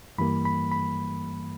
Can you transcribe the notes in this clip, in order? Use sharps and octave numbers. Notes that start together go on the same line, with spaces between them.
G2 E3 G3 A#3 B5
B5
B5